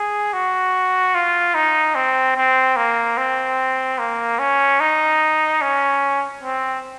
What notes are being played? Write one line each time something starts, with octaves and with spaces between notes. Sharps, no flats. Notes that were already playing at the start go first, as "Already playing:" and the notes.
Already playing: G#4
F#4
F4
D#4
C4
C4
A#3
C4
A#3
C#4
D#4
C#4
C4